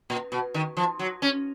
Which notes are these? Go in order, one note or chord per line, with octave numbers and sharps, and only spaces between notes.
A#2
B2
D#3
F3
F#3
C#4